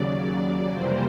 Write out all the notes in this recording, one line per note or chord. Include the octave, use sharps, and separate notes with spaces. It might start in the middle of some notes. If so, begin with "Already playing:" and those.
Already playing: D#2 C#3 F#3 D5
D5
F2 C3 E3 G3 A#3 C5